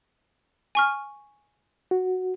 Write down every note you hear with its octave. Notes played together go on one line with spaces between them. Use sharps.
G#5 C#6 F6
F#4